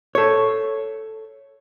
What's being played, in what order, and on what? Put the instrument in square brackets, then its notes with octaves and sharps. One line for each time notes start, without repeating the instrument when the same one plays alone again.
[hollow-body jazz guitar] A4 C#5